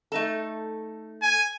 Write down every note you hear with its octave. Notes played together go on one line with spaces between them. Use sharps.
A3 D#4 A4
G#5